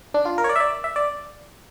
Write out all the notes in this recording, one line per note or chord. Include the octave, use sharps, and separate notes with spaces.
D4
F4
A#4
C#5
D5
E5
D5
E5
D5